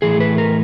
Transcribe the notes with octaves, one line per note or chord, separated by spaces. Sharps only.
A2 E3 A3 G#4
B4
A#4